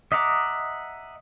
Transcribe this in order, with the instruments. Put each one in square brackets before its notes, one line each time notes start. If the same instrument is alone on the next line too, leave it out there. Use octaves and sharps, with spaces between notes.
[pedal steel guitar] D#5 E5 F#5 A#5 D6